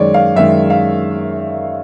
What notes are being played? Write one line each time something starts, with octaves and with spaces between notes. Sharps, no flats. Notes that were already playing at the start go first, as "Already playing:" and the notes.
Already playing: F#2 D#3 G#3 C#5 D5
F5
F#2 D#3 G#3 E5
F5